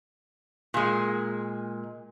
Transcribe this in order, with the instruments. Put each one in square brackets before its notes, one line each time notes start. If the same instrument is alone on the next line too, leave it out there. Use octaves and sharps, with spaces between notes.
[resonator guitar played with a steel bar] A#2 G#3